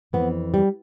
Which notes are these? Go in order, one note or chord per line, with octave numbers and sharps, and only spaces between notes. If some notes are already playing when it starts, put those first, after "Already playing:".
F2 E3 B3
G3